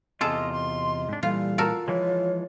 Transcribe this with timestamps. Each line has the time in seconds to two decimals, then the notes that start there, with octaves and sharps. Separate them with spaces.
0.21 E2 C3 F4 G#4 A4 D#5
0.53 D#5 C6
1.09 G#2 D4
1.23 A#2 E3 G3 F4 A4 F5
1.58 F4 F#4 A4 A#4
1.88 E3 F3 G#3 C#5